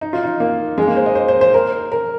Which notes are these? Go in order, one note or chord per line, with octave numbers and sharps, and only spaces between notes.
D#4
F4
D#4
A#3
G#3
A#3
C5
D#5
C5
C5
C5
A#4
A#4